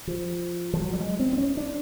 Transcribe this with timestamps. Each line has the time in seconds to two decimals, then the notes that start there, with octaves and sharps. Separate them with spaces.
0.07 F3
0.74 F3
0.82 F#3
0.93 G3
1.00 G#3
1.19 C4
1.33 C4
1.38 C#4
1.57 D4